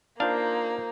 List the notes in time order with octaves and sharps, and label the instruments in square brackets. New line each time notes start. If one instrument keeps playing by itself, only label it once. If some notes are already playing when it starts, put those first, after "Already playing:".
[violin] A#3 [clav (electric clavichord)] D4 F5 [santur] D#4 F4 C5